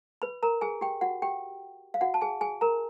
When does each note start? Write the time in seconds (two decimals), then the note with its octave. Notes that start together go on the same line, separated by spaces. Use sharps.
0.22 B4 B5
0.43 A#4 A#5
0.61 G#4 G#5
0.81 G4 G5
1.01 F#4 F#5
1.22 G4 G5
1.94 F5
2.01 F#4 F#5
2.14 A5
2.21 G#4 G#5
2.41 G#4 G#5
2.61 A#4 A#5